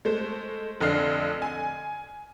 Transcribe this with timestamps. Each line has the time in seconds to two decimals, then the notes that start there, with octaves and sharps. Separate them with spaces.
0.05 G#3 A3 C5
0.80 F1 D3 D4 D#5 F6 C7
1.42 G#5